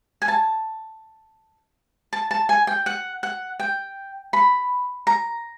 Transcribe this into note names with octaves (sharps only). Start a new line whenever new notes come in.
G#5
A5
A5
A5
G#5
G5
F#5
F#5
G5
B5
A#5